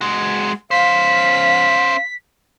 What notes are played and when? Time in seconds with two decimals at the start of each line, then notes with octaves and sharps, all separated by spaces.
0.01 G#3 F#4
0.71 C#4 C5 F5 B6